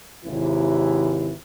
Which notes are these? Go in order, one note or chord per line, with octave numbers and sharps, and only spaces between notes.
G#1 D#2 C3 E3 E4